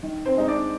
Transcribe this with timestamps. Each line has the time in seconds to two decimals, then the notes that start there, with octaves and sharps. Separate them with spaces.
0.03 D#3
0.26 C4 C5
0.37 G#3 D#4
0.48 D4 D5